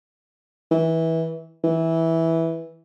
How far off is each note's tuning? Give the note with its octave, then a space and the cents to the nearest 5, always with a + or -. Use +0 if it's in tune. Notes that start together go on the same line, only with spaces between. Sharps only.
E3 -20
E3 -10